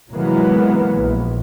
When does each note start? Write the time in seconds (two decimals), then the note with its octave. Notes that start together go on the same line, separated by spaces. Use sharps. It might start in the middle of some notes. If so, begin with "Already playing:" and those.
0.11 C3 E3 F#3 G#3 A#3 B3
0.97 A#1